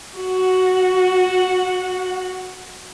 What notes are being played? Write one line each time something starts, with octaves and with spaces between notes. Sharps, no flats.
F#4 F#5